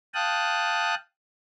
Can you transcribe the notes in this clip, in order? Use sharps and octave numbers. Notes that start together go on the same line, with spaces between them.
F5 G5 A5 D#6 F#6